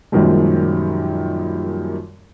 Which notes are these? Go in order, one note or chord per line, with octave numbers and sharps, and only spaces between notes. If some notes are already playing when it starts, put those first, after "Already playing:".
F#2 A#2 D#3 F3 G3 G#3